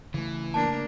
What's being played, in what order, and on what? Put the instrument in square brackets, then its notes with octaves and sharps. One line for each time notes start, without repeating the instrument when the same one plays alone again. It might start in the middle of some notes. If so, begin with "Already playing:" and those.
[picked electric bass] C#3 A3 [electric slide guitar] E3
[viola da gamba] A#3 D4 [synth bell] A5